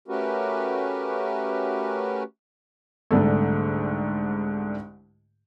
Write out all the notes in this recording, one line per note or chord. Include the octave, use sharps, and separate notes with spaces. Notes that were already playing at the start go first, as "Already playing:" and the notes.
A3 C#4 F#4 G4 A#4 B4
C2 G#2 D3 A3